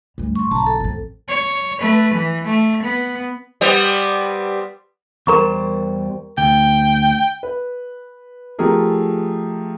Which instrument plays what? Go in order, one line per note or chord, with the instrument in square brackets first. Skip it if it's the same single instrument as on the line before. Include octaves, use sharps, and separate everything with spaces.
[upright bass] D2 G2
[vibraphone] C6 C#6
[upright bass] B1 D3 [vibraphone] A5 A#5
[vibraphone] A4
[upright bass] A1 F2
[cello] C#5
A3 B4
E3
A3
B3
[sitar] G3 B3 C4
[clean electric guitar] E2 G3 C5 [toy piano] A#4 A#5 C#6
[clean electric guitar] D2 [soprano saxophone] G5
[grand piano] B4
F3 A3 G4 G#4 A#4